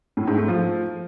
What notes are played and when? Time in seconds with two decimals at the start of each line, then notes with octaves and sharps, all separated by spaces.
0.17 A2
0.27 G#2
0.38 A3
0.48 F3